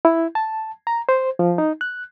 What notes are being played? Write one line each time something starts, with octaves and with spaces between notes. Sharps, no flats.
E4
A5
A#5
C5
F3
D#4
F#6